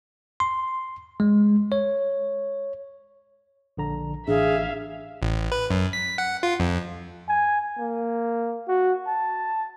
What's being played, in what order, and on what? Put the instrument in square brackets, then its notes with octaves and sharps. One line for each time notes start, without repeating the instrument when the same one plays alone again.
[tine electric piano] C6
G#3
C#5
A#1 D3 A#5
[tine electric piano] A1 [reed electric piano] D4 [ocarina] G#4 [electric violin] E5 F5
[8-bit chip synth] A1
B4
F#2
B6
F#5
F4
F2
[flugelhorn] G#5
A#3
F#4
A5